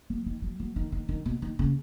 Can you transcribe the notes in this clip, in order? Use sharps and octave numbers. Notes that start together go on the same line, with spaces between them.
F#3
D#3
F#3
F#3
D#3
D#3
D#3
B2
D#3
C#3